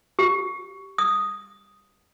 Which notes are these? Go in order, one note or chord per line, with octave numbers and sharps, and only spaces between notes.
G4
D#6